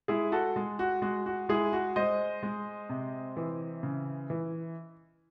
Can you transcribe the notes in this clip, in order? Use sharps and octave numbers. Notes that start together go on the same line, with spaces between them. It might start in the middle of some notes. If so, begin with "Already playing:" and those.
G#3 E4 G#4
F#4 A4
G#3
F#4
G#3 F#4
F#4
G#3 E4 G#4
F#4
G#3 C5 D#5
G#3
C3
E3
C#3
E3